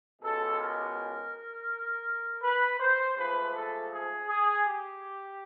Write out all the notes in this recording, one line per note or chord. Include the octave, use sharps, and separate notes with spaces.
C#2 B2 G#3 A4
A#4
B4
C5
G#2 F3 A3 B4
A4
G#4
G#4
G4